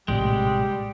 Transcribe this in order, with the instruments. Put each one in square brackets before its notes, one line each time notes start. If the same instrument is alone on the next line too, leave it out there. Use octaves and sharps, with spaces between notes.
[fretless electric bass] A#1 A2 C3 [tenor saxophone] G3 [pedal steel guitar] G#3 [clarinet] G5